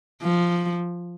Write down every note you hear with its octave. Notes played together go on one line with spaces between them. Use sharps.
F3